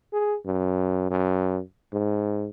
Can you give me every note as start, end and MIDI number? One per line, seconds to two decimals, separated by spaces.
0.13 0.37 68
0.46 1.08 42
1.10 1.60 42
1.93 2.48 44